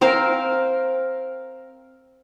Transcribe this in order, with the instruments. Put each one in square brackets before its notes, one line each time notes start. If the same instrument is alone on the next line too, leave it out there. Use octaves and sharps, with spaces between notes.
[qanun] C4 A#4 F5 G5